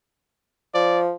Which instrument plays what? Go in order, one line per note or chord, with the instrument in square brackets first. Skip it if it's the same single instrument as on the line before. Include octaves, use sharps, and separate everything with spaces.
[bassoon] F3 [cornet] D5